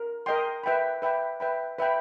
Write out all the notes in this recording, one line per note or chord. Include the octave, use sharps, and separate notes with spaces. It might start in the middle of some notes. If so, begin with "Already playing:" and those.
Already playing: A#4
A#4 D#5 G5 C6
B4 E5 G5 B5
B4 E5 G5 B5
B4 E5 G5 B5
B4 E5 G5 B5